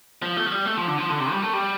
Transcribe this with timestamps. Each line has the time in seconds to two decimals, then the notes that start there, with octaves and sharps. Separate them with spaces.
0.22 F3
0.37 A3
0.46 F3
0.51 G3
0.66 A3
0.77 F3
0.88 D3
0.98 F3
1.09 D3
1.20 C3
1.32 G3
1.42 A3
1.54 G3